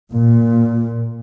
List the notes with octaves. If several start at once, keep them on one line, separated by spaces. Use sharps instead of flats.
A#2